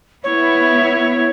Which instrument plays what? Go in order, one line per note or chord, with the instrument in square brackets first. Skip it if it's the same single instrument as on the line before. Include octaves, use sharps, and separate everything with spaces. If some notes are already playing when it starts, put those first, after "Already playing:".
[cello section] B3 E4 [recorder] C#5